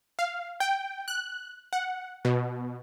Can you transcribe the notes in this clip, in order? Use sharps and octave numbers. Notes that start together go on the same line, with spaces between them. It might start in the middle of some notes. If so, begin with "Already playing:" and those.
F5
G5
F#6
F#5
B2